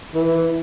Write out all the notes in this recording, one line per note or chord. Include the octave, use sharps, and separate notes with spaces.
E3